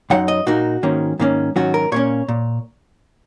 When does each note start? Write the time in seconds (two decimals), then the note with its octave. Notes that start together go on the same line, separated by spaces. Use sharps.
0.10 F#2 F#3 D#4 F#5
0.28 D#5
0.47 A#2 A#3 D#4 F#4
0.83 G#2 D#3 A#3 C#4
1.19 G#2 D#3 A#3 C#4
1.56 G#2 D#3 F#3 C#4 F#4
1.74 A#4
1.92 A#2 A#3 C#4 C#5
2.29 A#2